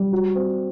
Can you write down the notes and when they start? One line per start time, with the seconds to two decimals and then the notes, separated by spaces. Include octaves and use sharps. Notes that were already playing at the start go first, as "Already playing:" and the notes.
Already playing: G3
0.13 F#4
0.35 C4